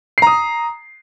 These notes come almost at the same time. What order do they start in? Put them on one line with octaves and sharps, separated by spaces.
C7 A#5 D#6